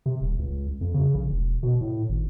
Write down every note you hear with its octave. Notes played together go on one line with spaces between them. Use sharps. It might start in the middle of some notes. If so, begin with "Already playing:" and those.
C3
D#1
C#2
F2
C#3
A#1
E1
B2
A2
G#1